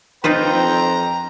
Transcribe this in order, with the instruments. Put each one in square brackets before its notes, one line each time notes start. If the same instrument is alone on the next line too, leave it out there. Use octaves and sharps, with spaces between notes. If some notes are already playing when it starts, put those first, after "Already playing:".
[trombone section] F2 [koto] D#4 F4 B4 [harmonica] C5 G5 [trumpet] A#5